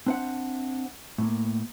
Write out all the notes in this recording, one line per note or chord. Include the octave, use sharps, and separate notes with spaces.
C4 D4 C5 E5 F#5
A2 A#3